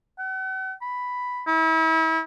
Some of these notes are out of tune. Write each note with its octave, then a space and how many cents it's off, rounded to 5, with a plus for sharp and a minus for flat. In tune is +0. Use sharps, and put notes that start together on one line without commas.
F#5 +40
B5 +5
E4 -35